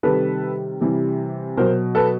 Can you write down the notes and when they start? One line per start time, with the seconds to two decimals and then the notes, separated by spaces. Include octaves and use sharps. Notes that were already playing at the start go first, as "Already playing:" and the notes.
0.03 C3 D#3 G3 A4 B4
0.81 C3 E3 G3
1.57 B2 F#3 A#4 C5
1.95 A4 B4